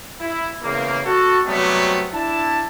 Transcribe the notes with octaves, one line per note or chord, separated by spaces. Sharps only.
E4
E2 C#3 A#3
F#4 A4
C3 F#3 G3 A3 B3
D4 E4 A5